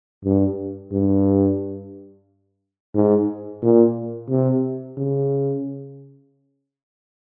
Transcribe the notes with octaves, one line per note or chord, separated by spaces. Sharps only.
G2
G2
G#2
A#2
C3
C#3